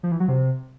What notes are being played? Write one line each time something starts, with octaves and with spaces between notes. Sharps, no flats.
F3
E3
F#3
C3